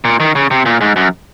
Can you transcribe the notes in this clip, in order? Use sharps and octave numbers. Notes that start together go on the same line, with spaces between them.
A#2
D#3
C#3
C3
A#2
G#2
F#2